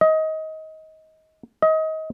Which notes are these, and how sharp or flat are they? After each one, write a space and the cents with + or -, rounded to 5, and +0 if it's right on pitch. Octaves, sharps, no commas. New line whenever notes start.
D#5 +20
D#5 +25